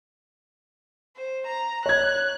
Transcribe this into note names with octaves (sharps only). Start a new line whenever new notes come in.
C5
A#5
C#5 F#6 G#6